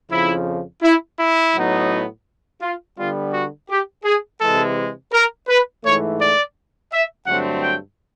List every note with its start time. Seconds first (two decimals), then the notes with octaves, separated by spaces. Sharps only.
0.12 F2 C#3 F3 E4
0.83 E4
1.19 E4
1.55 A2 F#3 B3 D#4
2.61 F4
2.98 D3 G3 B3 F4
3.33 F#4
3.70 G4
4.05 G#4
4.40 C3 E3 G#3 A4
5.12 A#4
5.48 B4
5.83 G#2 E3 A3 C#5
6.20 D5
6.92 E5
7.26 G2 D3 F#3 A3 C4 F#5
7.63 G5